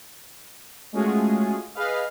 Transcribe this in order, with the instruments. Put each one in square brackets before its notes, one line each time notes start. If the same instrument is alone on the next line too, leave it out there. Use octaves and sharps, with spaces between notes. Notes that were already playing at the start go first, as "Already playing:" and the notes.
[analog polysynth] G#3 A3 C#4 F4 F#4 G#4
G#4 B4 D#5 F5